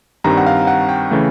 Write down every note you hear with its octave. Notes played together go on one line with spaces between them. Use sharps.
G2 D#3 G3 C4 A#5
F#5
F5
F#5
G5
C#3 E3 A3